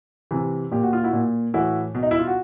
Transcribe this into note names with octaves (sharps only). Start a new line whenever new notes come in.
C3 E3
A#2 G4
F#4
F4
E4 F#4
A#2
A2 E3 E4 F#4
B2
D#4
E4
F4
F#4